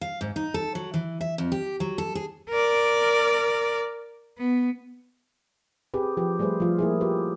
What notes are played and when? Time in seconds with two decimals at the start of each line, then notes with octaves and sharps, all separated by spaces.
0.01 F5
0.21 G#2
0.36 D#4
0.54 A4
0.75 F#3
0.94 E3
1.21 E5
1.38 F2
1.52 G4
1.80 F#3
1.98 A4
2.15 G#4
2.50 A#4 D5
4.38 B3
5.94 C4 G4 G#4 B4
6.17 F3 G4 B4
6.39 G3 A3 G#4 B4 C5
6.60 F3 F4
6.79 A#3 E4 G#4
7.01 F4 G4 B4